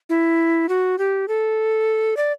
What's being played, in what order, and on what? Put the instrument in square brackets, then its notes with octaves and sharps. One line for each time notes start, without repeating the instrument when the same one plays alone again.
[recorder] E4
F#4
G4
A4
D5